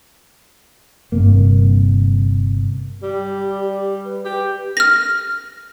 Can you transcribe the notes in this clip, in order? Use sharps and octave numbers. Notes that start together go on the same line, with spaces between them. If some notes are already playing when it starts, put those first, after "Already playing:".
G1 G2 C3 A#3
G3 G4
B4
G4
F6 A#6